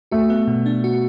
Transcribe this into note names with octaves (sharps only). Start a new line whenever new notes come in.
A3 F#4
B3
B2
D4
F#4